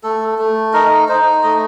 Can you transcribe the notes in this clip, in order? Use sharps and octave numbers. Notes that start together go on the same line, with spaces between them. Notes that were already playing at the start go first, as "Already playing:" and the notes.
A3 A4
A3
D#4 A#4
D#4 C5
A3 D#5